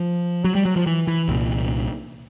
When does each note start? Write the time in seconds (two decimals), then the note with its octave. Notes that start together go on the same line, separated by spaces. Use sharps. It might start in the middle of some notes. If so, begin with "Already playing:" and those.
Already playing: F3
0.45 F#3
0.55 G3
0.65 F#3
0.76 F3
0.86 E3
1.07 E3
1.28 C2 A#2